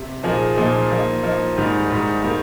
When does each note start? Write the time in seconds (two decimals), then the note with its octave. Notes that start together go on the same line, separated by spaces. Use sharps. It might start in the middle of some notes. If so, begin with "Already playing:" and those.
Already playing: C3
0.23 A#2 F3 A#3 D#4 G#4
0.57 A#2 F3 A#3 D#4 G#4
0.90 F3 A#3 D#4
1.23 F3 A#3 D#4
1.57 G#2 D#3 G3
1.90 G#2 D#3 G3
2.23 D#3 G3 A#3